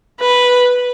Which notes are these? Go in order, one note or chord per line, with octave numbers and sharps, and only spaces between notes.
B4